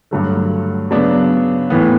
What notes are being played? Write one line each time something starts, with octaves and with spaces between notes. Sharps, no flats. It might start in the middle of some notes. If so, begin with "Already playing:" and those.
G2 D3 F#3 A3
C#3 F#3 B3 D4
A2 E3 B3